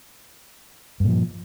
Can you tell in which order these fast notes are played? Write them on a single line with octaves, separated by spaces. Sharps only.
G2 A#2 F3